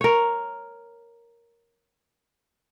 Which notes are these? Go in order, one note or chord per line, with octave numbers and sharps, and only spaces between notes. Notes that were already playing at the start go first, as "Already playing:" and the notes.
A#4 C#5